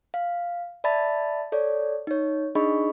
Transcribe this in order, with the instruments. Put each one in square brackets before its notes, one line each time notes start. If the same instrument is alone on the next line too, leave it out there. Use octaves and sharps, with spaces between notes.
[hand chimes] F5
D5 E5 A5 B5 A6
A4 C#5 D5
D#4 C#5
D4 D#4 G#4 D#5 B5 C#6